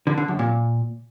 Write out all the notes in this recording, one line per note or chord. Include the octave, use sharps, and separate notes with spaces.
D3
D3
F#2
A#2